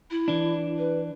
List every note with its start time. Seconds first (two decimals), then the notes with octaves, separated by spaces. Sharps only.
0.10 E4
0.28 E3 D4
0.78 B4